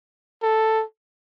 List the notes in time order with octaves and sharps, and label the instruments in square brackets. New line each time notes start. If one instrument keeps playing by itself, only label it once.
[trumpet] A4